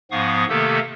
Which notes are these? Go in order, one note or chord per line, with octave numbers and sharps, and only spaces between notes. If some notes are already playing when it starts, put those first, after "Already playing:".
G#2 F3 B3 F5 C#6 D#6
C3 D#3 A3 A#3 G4 A4